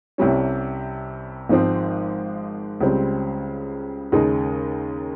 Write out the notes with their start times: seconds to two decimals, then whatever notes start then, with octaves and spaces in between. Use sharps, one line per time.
0.18 C2 C3 G3 C#4
1.49 G#1 G#2 F3 C4
2.81 C#2 C#3 G3 C4
4.12 D#2 C#3 G#3 D#4